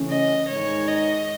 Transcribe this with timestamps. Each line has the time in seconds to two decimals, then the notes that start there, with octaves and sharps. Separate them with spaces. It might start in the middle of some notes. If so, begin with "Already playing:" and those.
Already playing: C#3 E3 A3 C#4
0.09 D#5
0.48 G#2 D#3 G#3 D#4 C#5
0.88 D#5